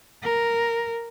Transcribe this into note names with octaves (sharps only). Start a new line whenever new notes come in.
A#4